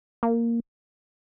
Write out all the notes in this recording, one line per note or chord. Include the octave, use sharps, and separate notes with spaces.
A#3